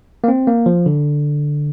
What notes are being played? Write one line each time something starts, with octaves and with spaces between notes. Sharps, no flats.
A#3
C4
A#3
F3
D3